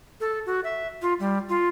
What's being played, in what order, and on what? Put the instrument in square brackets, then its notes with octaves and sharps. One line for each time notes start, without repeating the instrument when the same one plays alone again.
[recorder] A4
F#4
E5
F4
G3
F4